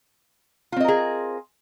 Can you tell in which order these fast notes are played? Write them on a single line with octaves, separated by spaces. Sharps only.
F4 C4 D#5 A#4 G#4